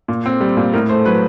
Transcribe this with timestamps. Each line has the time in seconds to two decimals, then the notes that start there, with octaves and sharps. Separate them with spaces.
0.08 A#2
0.26 C4
0.41 G3
0.57 A#2
0.73 A2 A#4
0.89 A3 C5
1.05 F#3 B4